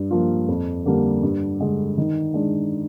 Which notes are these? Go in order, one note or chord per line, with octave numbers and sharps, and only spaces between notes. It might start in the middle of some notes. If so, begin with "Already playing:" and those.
Already playing: G2
F3 A#3 F4
F2
D3 G3 A#3 D4
G2
D3 G#3
D#3
G#3 D4